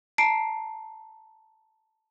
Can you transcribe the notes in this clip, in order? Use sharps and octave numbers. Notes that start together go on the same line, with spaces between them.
A5 A#5 C7 D7